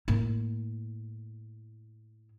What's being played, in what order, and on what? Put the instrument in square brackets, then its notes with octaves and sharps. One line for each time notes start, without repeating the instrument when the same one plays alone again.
[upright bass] A2 A#3